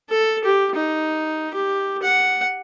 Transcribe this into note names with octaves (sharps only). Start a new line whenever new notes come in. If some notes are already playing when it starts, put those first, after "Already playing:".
A4
G4
D#4
G4
F#5